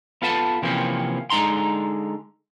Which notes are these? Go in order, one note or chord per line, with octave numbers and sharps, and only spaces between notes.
B3 F4 A4 B4 A5
C3 E3 F3 A#3 C4 C#4
D3 G#3 D#4 A#5 C6